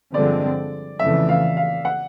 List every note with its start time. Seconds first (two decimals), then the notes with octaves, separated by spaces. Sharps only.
0.13 G2 D3 F3 G#3 C4 D5
0.99 F2 C#3 E3 A3 E5
1.29 F5
1.57 F5
1.85 F#5